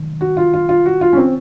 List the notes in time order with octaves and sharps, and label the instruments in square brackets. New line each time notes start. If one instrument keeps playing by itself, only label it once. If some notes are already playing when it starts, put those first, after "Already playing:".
Already playing: [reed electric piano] D#3
[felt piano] F#4
F4
F4
F4
F#4
F4
C#4
C4